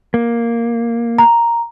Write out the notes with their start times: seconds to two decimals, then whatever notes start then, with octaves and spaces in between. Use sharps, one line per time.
0.14 A#3
1.18 A#5